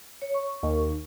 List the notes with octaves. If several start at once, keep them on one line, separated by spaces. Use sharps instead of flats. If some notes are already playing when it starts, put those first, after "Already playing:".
C#5
C#6
D#2